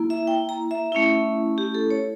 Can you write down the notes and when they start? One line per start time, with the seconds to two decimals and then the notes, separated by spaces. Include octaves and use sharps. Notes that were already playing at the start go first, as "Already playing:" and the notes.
Already playing: A#3 E4
0.10 E5
0.27 G5
0.49 A#5
0.71 E5
0.92 A3 C#4 E4
1.58 G4
1.74 A4
1.90 C#5